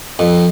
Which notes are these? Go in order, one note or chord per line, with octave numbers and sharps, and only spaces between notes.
F2